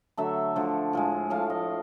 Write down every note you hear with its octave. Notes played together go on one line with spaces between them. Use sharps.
D3 F#3 A3 E5
D3 F3 A3
A2 F3 G#3
A2 F3 A3 F5
D#5